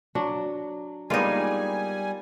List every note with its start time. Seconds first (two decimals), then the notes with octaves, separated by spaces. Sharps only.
0.15 F#3 D4
1.10 G3 G#3 A#3 B3 D#4 F4 G#5